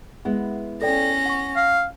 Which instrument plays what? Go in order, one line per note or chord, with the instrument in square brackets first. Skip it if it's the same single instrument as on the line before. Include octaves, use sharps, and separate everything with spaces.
[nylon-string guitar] G#3 B3 E4
[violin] C#4 A#6 [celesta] A4 D5 G5
[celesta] F#5 C#6
[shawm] F5